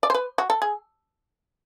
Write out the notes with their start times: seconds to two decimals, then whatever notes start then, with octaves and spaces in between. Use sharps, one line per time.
0.03 D5
0.10 C5
0.14 B4
0.38 F#4
0.50 A4
0.62 G#4